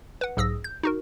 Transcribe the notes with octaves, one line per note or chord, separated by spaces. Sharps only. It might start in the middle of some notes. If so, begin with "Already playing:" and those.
B4 F#5
B1 G#2 G#4 D#6 E6 A#6
G6
D#4 F#4 A#4